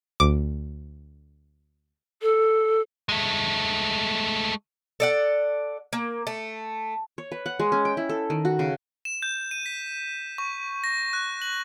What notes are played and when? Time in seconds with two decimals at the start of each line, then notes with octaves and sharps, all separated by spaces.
0.20 D2 D6
2.21 A4
3.09 G#3 A3
5.00 A4 D5 F#5
5.93 A#3
6.27 A3
7.18 C#5
7.32 B4
7.46 F#5
7.60 G#3
7.72 C#4
7.85 G5
7.97 E4
8.09 A4
8.30 D#3
8.45 F#4
8.59 C#3
9.05 E7
9.22 G6
9.51 D#7
9.66 B6
10.38 C#6
10.84 A#6
11.13 F#6
11.42 F#7